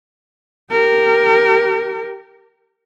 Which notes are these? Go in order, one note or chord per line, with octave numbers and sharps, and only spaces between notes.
G4 A#4